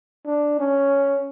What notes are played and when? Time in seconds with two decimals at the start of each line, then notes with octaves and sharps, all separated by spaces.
0.26 D4
0.59 C#4